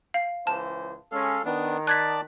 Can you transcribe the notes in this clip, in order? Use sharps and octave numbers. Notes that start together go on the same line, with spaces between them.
F5
C#2 E3 C5 A5
G#3 C#4 A4 F5
D#3 B3 D4
D5 A5 F#6 G#6 B6